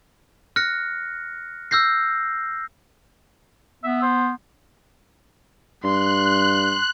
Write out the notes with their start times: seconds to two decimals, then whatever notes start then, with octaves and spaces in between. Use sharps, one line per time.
0.56 F6 F#6 A#6 C#7
1.71 E6 F6 G6 A#6 C7
3.84 B3 E5
4.02 C5
5.84 G2 C6 F#6